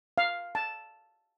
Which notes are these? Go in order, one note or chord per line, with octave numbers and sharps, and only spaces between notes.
F5
A5